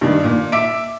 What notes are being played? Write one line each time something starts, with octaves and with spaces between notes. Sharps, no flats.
G2 D#3
A#2
E5 D6 D7